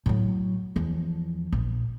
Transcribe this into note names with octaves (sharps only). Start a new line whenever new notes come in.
A2 F#3
E2 F3
A#1